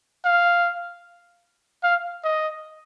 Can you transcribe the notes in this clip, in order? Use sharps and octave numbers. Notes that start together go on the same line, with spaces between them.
F5
F5
D#5